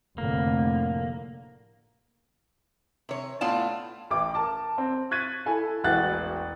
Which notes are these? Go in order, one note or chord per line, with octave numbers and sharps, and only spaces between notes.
F1 A2 D3 A#3
C3 C#5
A2 B3 F4 D5 A5
A1 D6
A#4 A5 D6
C4
C#6 F#6 G#6 A6 B6 D#7
E4 A4 G#5
E1 A1 E3 F#4 F#6 A6